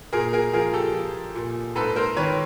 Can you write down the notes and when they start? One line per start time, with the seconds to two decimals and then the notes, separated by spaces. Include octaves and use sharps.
0.13 A#2 G#4 A#4
0.33 G#4 A#4
0.53 F3 G#4 A#4
0.73 G4 A4
0.94 F3
1.35 A#2
1.75 G#2 A4 B4
1.96 A#4 C5
2.17 D#3 B4 C#5